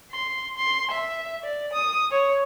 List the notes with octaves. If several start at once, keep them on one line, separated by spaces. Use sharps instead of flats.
C6
C6
E5
D5
D#6
C#5